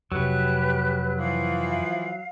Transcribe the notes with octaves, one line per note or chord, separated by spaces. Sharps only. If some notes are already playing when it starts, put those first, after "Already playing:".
F2 C3 F#3 G4 B4 F#6
E3 F3 F5